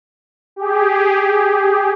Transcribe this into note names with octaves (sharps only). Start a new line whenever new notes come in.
G4 G#4